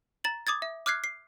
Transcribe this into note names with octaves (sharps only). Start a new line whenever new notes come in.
A#5 A6 F#7
D6 D#6 G#6 A6
E5
D6 F6 F#6 G#6 C7
C7